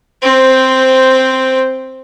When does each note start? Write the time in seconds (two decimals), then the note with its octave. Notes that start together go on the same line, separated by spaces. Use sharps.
0.22 C4 C5